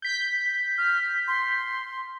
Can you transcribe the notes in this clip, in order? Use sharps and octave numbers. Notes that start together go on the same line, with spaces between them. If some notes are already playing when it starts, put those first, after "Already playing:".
G6 B6
F6
C6